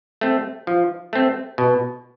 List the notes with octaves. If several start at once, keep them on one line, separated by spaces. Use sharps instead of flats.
A3 C4
F3
A3 C4
B2